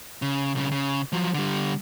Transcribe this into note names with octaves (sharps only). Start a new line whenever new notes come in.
C#3
B1 C#3
C#3
F3 F#3
D3 G3